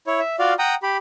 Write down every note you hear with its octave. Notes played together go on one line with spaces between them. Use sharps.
E4 C#5
E5
F4 F#4 D5 F5
F#5 G5 A#5 D#6
G4 B5